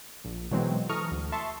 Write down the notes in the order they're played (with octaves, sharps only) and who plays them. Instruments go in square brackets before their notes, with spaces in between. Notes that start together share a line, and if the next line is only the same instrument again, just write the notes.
[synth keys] A#1
B2 E3 F#3 G#3 C4
E3 A4 A#5 C#6 D#6 F6
D2
E5 A5 C6 C#6